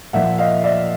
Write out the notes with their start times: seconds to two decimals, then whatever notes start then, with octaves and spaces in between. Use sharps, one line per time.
0.13 A#2 F3 A#3 E5 F#5
0.38 D#5 F5
0.64 D5 E5